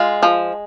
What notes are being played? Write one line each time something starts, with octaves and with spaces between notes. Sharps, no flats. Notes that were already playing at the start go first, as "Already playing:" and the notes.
Already playing: G#3 F4
F3